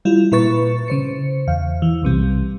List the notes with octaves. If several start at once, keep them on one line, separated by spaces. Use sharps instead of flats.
G3 E4 F4
A#2 E4 B4 C#6 A6 C#7
C#3 C5 C#7
E2 F5
E3
B1 C3 G3